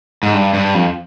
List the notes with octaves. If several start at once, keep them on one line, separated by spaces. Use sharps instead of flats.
G#2
G2
G2
F2